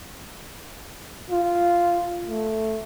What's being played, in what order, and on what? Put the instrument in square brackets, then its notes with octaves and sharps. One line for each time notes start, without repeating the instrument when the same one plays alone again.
[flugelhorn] F4
A3